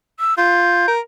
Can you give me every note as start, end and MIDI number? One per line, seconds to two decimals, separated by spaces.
0.20 0.34 88
0.38 0.86 65
0.38 0.92 91
0.88 1.00 70